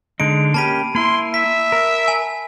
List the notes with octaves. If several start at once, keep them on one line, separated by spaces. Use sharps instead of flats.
D3 G#3 D#4 D7
A#3 C#4 G4 A5 B5 D#7
A#3 E4 C6
E5 B6
A#4
G#5